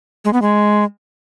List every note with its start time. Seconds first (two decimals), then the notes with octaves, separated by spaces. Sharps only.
0.25 G#3
0.33 B3
0.42 G#3